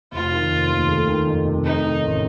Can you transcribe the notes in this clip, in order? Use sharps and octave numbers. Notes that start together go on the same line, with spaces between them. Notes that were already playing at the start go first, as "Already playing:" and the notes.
F1 F4
D#3
F1
D#2
A3
D#3
F2
C3
A3 D#4
D#3
A1